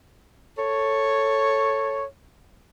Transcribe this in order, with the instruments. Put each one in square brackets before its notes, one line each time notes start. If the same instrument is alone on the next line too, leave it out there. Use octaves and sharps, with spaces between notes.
[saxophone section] A4 C#5